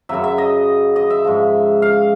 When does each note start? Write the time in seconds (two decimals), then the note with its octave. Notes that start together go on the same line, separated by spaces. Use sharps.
0.09 F#2 C#3 F#3 E5
0.24 E5
0.38 D#5
0.96 D#5
1.10 E5
1.24 G#2 F3
1.82 F5